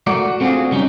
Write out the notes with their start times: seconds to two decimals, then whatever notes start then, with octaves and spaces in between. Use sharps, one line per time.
0.07 A3 F#4 A#4 D5
0.28 F#4
0.41 A3 C4 D4 F4 F#4 G#4
0.71 C#3 G3 B3 C#4 D#4